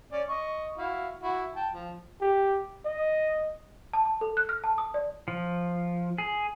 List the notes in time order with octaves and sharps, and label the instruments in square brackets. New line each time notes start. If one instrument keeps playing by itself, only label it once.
[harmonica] C#4 D5
D#5 C#6
E4 F#4 F5
E4 F#4
G5 A5
F3
[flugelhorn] G4
D#5
[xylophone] A5
A5
A4
F#6
F6
A5
D#6
D5
[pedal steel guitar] F3
G#4